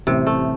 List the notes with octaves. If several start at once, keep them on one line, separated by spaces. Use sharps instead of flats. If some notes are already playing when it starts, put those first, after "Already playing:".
A1 A2 C3 G3 C4
A3